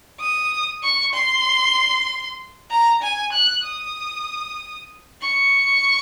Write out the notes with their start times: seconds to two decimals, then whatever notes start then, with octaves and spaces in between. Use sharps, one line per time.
0.20 D#6
0.83 C#6
1.14 C6
2.70 A#5
3.03 G#5
3.33 F#6
3.65 D#6
5.21 C#6